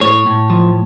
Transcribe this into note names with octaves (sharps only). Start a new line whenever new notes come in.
A2 C#5
A2
F3